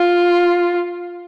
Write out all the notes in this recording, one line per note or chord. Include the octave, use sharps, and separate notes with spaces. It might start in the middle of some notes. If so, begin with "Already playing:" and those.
Already playing: F4